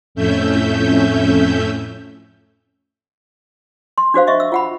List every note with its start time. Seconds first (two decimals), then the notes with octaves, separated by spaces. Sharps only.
0.15 F2 A2 A3 C#4 E5 G6
3.98 C6
4.14 D4 F#4 C5 F5
4.27 D#5 E5 C#6
4.40 E6
4.52 F4 F#5 B5